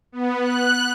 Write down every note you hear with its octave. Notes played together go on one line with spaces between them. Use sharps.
B3
F#6